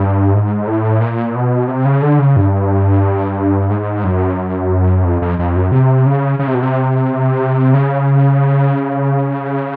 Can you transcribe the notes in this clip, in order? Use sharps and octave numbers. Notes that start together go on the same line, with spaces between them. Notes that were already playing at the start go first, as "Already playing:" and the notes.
Already playing: G2
G#2
A2
A#2
B2
C3
C#3
D3
C#3
G2
G#2
F#2
F2
F2
F2
F#2
C3
C#3
C#3
C3
B2
C3
C#3